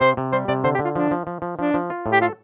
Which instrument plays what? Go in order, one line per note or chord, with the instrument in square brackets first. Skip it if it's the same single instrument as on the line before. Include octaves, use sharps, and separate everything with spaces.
[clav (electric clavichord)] C3 [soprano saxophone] C5
[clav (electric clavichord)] C3
[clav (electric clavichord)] G3 [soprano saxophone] C5
[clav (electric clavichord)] C3 [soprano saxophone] D5
[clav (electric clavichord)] D3 [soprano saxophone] C5
[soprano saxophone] G4
[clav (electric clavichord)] D3
[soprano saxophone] F4
[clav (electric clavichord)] F3 [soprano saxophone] D4
[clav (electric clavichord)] F3
F3
F3
[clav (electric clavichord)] F3 [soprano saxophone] D4
[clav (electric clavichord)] F3
F4
A2
[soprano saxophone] G4
[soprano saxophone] F4 [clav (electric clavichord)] A4